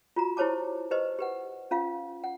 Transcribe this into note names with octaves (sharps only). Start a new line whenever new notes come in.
F4 F#4 A#5
E4 G4 C5 C#5 A5 D6
G4 B4 C5 D#5
G4 B4 F#5
C#4 F4 F5
F#5